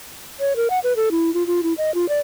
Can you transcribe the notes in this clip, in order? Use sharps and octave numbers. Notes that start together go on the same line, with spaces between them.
C#5
A#4
F#5
B4
A4
E4
F4
F4
E4
D#5
F4
D5